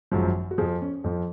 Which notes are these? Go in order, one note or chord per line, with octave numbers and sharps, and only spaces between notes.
G#1 F#2 F3
F#4
F2 F3 G#4
C#4
F2 F3